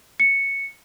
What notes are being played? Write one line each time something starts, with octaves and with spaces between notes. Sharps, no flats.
C#7